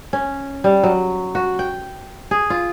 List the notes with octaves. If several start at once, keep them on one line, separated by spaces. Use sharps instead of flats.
C#4
G3
F#3
F#4
G5
G#4
F4